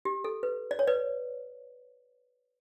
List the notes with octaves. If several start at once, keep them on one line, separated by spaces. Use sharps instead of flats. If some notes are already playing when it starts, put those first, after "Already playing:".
G4
A4
B4
D5
C#5
B4 D5